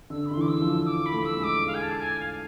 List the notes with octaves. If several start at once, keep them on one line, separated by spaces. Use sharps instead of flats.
D3 E6
B5
D3 C6
E3
D6
E6
F3
D6
B5
A3
E6
G#3
D6
F5
G#5
A5
G#5
F5